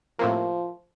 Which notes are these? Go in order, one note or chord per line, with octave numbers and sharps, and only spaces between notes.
A2 C3 F3 A#3